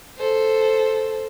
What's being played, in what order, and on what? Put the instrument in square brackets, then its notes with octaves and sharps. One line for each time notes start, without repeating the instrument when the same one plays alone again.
[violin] A4 C5